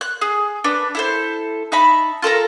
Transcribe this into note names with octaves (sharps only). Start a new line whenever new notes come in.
F#6
G#4
D4 B4
E4 A4 C5
D#4 E5 A5 B5
F4 A4 A#4 A#5